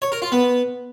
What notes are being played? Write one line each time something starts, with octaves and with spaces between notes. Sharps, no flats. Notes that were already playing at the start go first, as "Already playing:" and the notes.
C#5
A#4
F4
B3